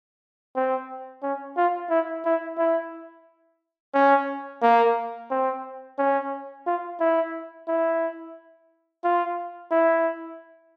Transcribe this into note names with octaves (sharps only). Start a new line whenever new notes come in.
C4
C#4
F4
E4
E4
E4
C#4
A#3
C4
C#4
F4
E4
E4
F4
E4